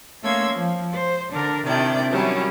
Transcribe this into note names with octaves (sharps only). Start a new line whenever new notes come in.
A3 A#3 C#4 C6 E6 G#6
F3
C5
D3 D4 A#4
C3 D#3 D4 E4 D5 G5
D#3 F#3 G3 C#4 E4